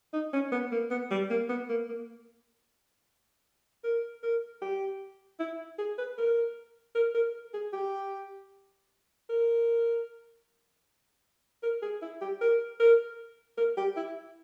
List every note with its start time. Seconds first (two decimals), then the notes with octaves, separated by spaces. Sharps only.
0.13 D#4
0.33 C#4
0.52 B3
0.72 A#3
0.90 B3
1.10 G3
1.30 A#3
1.49 B3
1.69 A#3
1.88 A#3
3.84 A#4
4.23 A#4
4.61 G4
5.39 E4
5.78 G#4
5.98 B4
6.18 A#4
6.95 A#4
7.14 A#4
7.54 G#4
7.73 G4
9.29 A#4
11.63 A#4
11.82 G#4
12.02 E4
12.21 G4
12.41 A#4
12.80 A#4
13.57 A#4
13.77 G4
13.96 E4